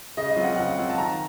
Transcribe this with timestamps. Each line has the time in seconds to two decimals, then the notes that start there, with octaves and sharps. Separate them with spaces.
0.17 C#3 D#5
0.31 D#5
0.36 F#3 C4 F4
0.44 F#5
0.57 C#3 F#5
0.78 F#3 C4 F4
0.89 A5
0.98 D#3 A#5